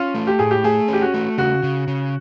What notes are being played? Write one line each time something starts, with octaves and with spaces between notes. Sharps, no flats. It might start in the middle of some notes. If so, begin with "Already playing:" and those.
Already playing: C#4 F4
A3
G4
A2 G#4
G4
A3 G#4
C#4 G4
F#4
A3
C#3 F#4
C#3
C#3